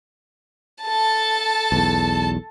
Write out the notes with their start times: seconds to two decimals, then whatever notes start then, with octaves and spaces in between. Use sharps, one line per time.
0.83 A4 A5
1.72 B1 E2